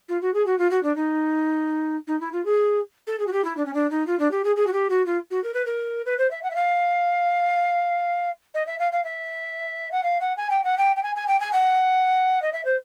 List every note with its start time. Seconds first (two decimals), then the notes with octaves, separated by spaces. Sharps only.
0.09 F4
0.21 F#4
0.34 G#4
0.46 F#4
0.58 F4
0.71 F#4
0.83 D4
0.95 D#4
2.07 D#4
2.20 E4
2.32 F4
2.45 G#4
3.07 A4
3.19 G#4
3.27 F#4
3.32 G4
3.44 E4
3.57 D4
3.65 C#4
3.74 D4
3.90 D#4
4.07 F4
4.19 D4
4.31 G4
4.44 G#4
4.56 G#4
4.67 F#4
4.72 G4
4.89 F#4
5.06 F4
5.31 F#4
5.44 A#4
5.54 B4
5.65 A#4
6.06 B4
6.18 C5
6.31 E5
6.43 F#5
6.50 E5
6.55 F5
8.54 D#5
8.66 E5
8.79 F5
8.92 F5
9.04 E5
9.92 F#5
10.03 F5
10.20 F#5
10.37 G#5
10.50 G5
10.64 F#5
10.78 G5
10.96 G5
11.03 G#5
11.15 G#5
11.28 G5
11.40 G#5
11.53 F#5
12.42 D#5
12.52 E5
12.65 C5